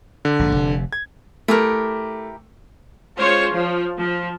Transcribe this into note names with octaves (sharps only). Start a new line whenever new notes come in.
D3
A#1 G#2
F1 C3
G#6
A3 E4 G4 A#4
G#3 C#4 F4 C5 C#5
F3
F3